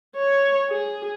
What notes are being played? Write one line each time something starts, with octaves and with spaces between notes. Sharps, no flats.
C#5
G#4